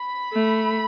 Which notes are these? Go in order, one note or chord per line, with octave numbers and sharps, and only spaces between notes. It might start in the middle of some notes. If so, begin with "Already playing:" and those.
Already playing: B5
A3